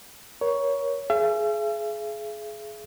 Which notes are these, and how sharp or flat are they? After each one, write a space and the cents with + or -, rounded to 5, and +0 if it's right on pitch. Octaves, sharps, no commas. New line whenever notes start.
A#4 +30 C#5 +10
G#4 +25 E5 +45